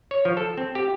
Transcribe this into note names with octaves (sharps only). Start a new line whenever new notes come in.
C#5
F3
A4
C4
G4